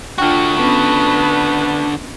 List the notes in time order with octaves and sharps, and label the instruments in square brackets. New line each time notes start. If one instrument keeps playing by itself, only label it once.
[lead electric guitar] D3 F#4 [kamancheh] D4 [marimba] F4 G5
[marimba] B3 C#4 D4 [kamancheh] B4 A5